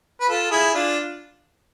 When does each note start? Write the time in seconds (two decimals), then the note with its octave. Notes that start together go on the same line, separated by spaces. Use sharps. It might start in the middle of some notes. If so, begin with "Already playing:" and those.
0.21 B4
0.29 F4 A4
0.51 E4 G#4
0.74 D4 F4